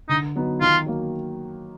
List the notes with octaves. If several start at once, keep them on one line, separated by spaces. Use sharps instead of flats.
D3 D#4
F#3 B3 D#4
D#3 F4
F#3 A#3